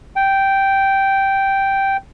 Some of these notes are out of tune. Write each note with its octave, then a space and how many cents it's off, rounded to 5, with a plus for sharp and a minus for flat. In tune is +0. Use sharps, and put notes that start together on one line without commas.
G5 -5